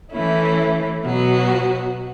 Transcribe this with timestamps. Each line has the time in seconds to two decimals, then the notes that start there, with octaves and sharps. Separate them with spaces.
0.12 E3 A3 C#4 E4
1.03 B2 F#3 B3 F#4